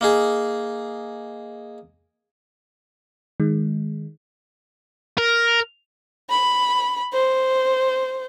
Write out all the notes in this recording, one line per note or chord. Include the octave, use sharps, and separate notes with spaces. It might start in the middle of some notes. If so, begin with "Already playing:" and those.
A#3 D#4 G#4
D#3 G#3
A#4
B5
C5